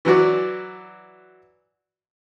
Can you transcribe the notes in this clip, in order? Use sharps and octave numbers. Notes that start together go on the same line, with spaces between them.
E3 F#3 F#4 D5